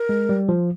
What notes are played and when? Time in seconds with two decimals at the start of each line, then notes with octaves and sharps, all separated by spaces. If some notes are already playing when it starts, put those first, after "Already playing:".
Already playing: A#4
0.09 G#3
0.29 G3
0.49 F3